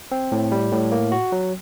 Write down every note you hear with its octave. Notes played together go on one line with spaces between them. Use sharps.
C4
A2
G3
A2
A#3
F#4
F#3